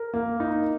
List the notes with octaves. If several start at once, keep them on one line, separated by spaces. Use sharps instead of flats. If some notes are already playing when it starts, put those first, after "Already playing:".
Already playing: A#4
A#3
D#4